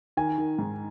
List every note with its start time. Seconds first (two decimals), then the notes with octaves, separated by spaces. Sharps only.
0.17 D#3 G#5
0.38 D#3
0.58 G#2